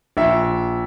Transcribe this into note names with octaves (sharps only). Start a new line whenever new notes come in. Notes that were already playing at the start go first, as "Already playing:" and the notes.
A#1 E5